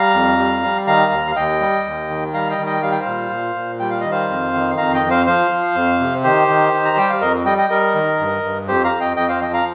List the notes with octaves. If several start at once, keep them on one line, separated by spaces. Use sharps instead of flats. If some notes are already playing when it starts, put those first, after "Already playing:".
Already playing: G3 F5 A#5
F2
G3
G3
D#3 F5 A#5
D#2
F5
D#2 D#5 G5
G3
D#2
D#3
G3 F5 A#5
D#5 G5
D#3
D#5 G5
G3 F5
G5
C5 F5
A#2
A#2
A#2
G3 G5
F5
D#3 D#5
C5 F5
F2
D#3
F2 F5 A#5
D#5 G5
F2
C5 F5
F3 C5 F5
F3
F2
C3
D#3 G4 C5
D#3
D#3
A#5
G3 G5
F5
F2 A#4 D#5
G3 D#5 G5
D#5 G5
G3 A#4 D#5
D#3
G2
G2
F2 G4 C5
F5 A#5
F2
D#5 G5
F2 D#5 G5
C5 F5
F3 D#5 G5
F5 A#5